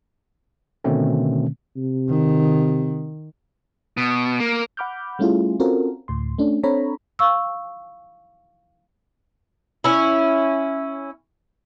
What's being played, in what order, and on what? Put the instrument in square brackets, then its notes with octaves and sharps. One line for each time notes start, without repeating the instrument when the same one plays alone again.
[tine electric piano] B2 D3 D#3 A3 C4 C#4
[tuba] C3
[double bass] D#3
[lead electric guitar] B2
A#3
[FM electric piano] F#5 B5 D6 F6 G6
G3 A3 C#4 E4 F4 G#4
C4 C#4 F4 F#4 A4 A#4
D2 A2 C6
A3 C#4 D4
C4 D4 A4 C#5 A#5 B5
[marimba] F5 C#6 E6
[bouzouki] C#4 E4